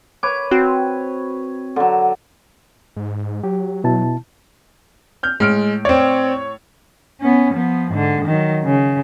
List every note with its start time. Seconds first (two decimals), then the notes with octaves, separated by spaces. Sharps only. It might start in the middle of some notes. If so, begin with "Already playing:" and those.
0.23 B4 C#5 D6
0.51 C4 F#4
1.76 D3 F#3
2.96 G#2
3.44 F#3 G4
3.84 B2 E4 A5
5.23 F6 G6
5.40 A2 G#3 F6 D7
5.85 C4 C#5 D5
7.21 B3 C#4
7.54 F3 B3
7.91 G#2 D3
8.26 D#3 F#3
8.64 C#3